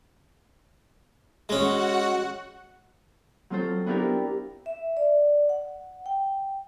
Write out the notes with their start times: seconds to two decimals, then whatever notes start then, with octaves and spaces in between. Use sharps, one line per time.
1.49 G#3 C#4 F#4 F#5
3.50 F#3 C4 F4 A4 C5
3.86 B3 D4 E4 F4 G4 A#4
4.66 E5
4.97 D5
5.49 F#5
6.06 G5